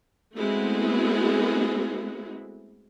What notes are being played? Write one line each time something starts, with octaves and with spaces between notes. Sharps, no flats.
G#3 A3 B3 C4 E4 F#4